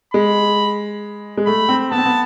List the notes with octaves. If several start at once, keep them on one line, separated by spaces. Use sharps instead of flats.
G#3 B5
G#3
A3 B5
C4
B3 A5
C4
B3